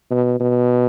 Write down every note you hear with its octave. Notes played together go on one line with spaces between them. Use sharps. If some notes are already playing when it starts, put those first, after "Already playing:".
B2
B2